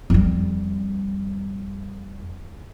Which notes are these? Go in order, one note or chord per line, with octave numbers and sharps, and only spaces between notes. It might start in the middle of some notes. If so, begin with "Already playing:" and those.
F2 G3